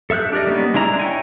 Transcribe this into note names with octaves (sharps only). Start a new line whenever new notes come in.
A4 E5 E6 F#6 G6
D4 G4 A#4 D5 D#5
G3 A#3 B3 C#4 D#4
G#3 D4 E4 A#5
C#5 G5 G#5